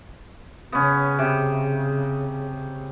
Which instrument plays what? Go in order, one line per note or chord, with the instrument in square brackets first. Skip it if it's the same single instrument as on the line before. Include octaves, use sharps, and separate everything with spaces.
[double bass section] C#3 [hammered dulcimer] B3 C#4
[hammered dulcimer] C3